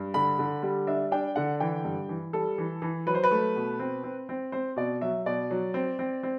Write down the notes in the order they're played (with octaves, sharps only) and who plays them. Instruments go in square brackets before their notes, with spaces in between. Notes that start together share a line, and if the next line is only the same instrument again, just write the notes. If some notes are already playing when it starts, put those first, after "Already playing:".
Already playing: [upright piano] G2
D3 B5
D3
G3
D4 E5
D4 G5
D3 F#5
E3 G5
G2
E3
G3 A4
E3
E3
F#3 B4
C5
B4
A3
B2
C4
C4
C4
C4 C5
B2 D5
F#3 E5
B2 D5
F#3
C4
C4
C4